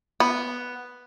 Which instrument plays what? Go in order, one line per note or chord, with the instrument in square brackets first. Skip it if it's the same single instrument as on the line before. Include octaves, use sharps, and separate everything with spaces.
[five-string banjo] B3